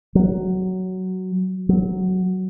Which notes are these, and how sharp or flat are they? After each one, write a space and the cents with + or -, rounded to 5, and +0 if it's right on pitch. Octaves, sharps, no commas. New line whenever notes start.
F#3 +10
F#3 +5